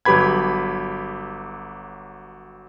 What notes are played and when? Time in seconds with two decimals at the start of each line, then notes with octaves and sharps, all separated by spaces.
0.05 G1 F#3 G4 B4 B5 G#6